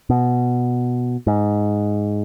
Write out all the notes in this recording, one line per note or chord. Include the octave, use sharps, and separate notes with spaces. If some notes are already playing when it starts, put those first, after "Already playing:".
B2
G#2